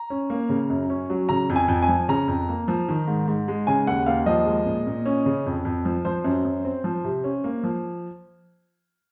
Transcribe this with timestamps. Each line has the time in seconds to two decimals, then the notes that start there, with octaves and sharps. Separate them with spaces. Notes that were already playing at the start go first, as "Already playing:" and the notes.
Already playing: A#5
0.10 C#4
0.30 A#3
0.49 C#3
0.70 F#2
0.90 C#4
1.10 F#3
1.29 C#3 A#5
1.50 F2
1.56 G#5
1.68 F2
1.82 G#5
1.88 F3
2.09 C#3 A#5
2.28 F2
2.49 A#3
2.68 F3
2.89 D#3
3.07 G#2
3.28 G#2
3.48 G#3
3.67 C#3 G#5
3.87 D#2 F#5
4.06 D#2 F5
4.26 F3 D#5
4.46 G#3
4.66 A#2
4.87 A#2
5.06 C#4
5.26 C#3
5.46 F2
5.65 F2
5.85 F3
6.05 F3 C5
6.24 F#2
6.45 F#2
6.65 C4
6.84 F3
7.04 C3
7.24 C#4
7.44 A#3
7.64 F3